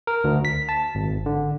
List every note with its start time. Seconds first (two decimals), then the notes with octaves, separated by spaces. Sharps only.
0.07 A#4
0.24 D2
0.45 B6
0.69 A5
0.95 G#1
1.26 D3